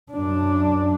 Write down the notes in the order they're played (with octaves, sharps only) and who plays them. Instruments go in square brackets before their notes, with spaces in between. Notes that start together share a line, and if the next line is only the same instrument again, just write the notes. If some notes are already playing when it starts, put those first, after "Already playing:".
[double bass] F#2 D4